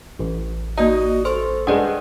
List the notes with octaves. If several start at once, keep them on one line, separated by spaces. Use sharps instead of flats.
A1
A#3 D#4 F#4 D5
A4 C5 C6 C#6
G2 G#3 B4 D5 F#5 D#6